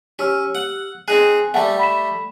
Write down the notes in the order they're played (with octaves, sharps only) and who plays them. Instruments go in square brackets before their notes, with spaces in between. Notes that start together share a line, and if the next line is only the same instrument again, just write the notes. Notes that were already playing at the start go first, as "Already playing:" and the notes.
[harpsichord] C#4 [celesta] G4 E6 F6
[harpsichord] F#5
[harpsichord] C4 D#4 G#4 [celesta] G#5 F#6
[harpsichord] G3 A3 [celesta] F#5 G5 A5
[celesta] B5 B6 E7